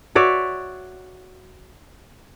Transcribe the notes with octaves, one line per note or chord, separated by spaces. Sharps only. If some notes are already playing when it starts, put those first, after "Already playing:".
F#4 C#5 D5 E5